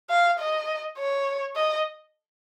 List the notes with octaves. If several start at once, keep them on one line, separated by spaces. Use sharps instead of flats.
F5
D#5
C#5
D#5